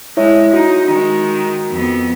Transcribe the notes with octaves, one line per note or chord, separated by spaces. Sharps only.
G#3 E4 C#5 E5
D#4 F#4
D#3 G#3
F2 B3